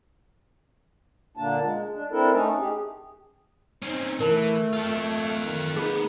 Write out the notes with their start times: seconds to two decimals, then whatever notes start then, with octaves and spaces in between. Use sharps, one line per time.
1.37 A#2 D3 A#3 D4 A5
1.62 G#3
1.92 D4
2.11 C4 D4 E4 A4 A#4
2.32 A3 C#4 D#4
2.59 G4 G#4
3.82 C4 C#4 D#4
4.20 E3 A3 A#4 A5
4.73 F4 A4
5.43 D#3
5.77 A#3 D#4 G#4 B4